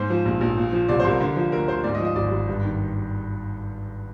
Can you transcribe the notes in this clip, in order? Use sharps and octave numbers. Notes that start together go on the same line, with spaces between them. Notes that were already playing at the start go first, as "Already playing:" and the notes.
Already playing: G#2 C5
F3
A#1
A#1
A#2
F3
C2 D5
C5
C2
A#4
D3
F3
D2 A#4
D2 C5
G#2 D5
D#5
F3
D#5
G#1 D5
G#1
G2
D#3